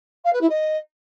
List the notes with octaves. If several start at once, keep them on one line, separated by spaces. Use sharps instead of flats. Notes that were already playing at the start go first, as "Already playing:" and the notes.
F5
B4
E4
D#5